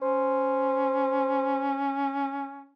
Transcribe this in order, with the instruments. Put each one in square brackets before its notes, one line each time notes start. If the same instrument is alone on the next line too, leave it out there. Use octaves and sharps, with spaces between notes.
[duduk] C#4 [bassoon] C5